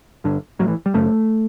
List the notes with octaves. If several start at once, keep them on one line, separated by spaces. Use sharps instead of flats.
G1 G2 D3
A1 A2 F#3
E3
G3
F#1 F#2 C#3 A3